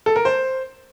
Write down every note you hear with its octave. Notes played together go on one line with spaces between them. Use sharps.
A4
A#4
C5